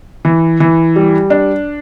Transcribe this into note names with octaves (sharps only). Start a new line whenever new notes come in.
E3
E3
G3
D4